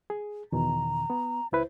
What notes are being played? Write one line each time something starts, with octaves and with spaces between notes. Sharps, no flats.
G#4
E2 B2 D#3 A#5
B3
C#2 E4 B4 C5